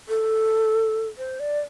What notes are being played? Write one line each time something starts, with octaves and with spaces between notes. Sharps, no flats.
A4
C5
D5